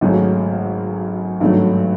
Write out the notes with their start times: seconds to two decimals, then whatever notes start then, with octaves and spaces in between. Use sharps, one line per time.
0.01 G#1 F#2 C#3 F#3 A3
1.40 G#1 G2 D#3 F#3 A3